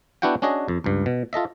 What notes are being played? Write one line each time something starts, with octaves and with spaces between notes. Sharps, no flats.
B3 D4 E4 F#4 F#5 G5
C#4 D4 F#4 G#4 D#5
F2
C#2 G2
B2
F4 A4 D#5 E5